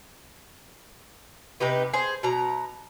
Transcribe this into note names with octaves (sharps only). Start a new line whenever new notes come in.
C3 D#4 G4 B4
G#4 C5
B2 A#5